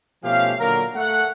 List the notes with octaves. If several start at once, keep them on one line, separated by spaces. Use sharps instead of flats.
B2 F3 A3 C#4 G4 F5
A#2 D3 F#3 A#3 A#4
A3 F#5